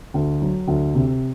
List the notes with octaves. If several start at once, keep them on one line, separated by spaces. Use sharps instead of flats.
D2
F#3
D2
C3